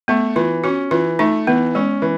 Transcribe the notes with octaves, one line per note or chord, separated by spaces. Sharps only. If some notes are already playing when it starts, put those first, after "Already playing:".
A3 B3
E3 F4
C#4 F#4
E3 F4
A3 D#4
E3 B3
G#3 C#4
E3